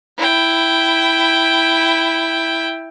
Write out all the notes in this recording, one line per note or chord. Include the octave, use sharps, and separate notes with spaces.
E4 G5